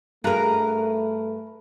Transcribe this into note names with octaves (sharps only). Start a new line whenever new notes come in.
G2 A3 F#4 G#4 A#4 B4 A#5